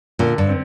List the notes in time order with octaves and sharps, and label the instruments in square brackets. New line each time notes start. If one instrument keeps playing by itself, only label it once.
[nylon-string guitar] A#2 [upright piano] D3
[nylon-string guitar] G2
[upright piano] C4